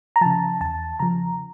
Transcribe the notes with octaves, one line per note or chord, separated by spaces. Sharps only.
A#5
C#3 F3 A5
E2 A5
C#3 F3 A#5